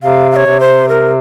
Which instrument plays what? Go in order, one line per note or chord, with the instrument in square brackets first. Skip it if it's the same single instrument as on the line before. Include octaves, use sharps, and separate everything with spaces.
[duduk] C3 [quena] F5
[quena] F5
C#5
[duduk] C3
[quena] C5
A#4